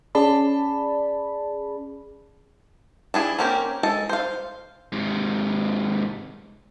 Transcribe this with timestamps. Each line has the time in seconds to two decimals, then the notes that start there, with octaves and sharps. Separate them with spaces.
0.15 C#4 G#4 D5 A5 B5
3.14 D4 E4 G#4
3.38 A#3 C4 C#4 G4 A#4
3.83 G#3 A4
4.09 C5 F5
4.92 G#2 C3